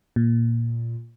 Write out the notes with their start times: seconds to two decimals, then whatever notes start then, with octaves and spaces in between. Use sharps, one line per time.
0.16 A#2